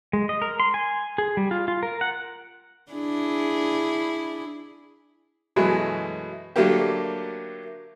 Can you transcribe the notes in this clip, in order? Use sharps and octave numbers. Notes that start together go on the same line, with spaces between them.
G#3
D#5
A#4
C6
G#5
G#4
G3
F4
F4
A#4
F#5
D4 E4 G#4
F#2 B2 E3 F#3 G#3 A3
D3 F#3 G3 A3 A#3 G4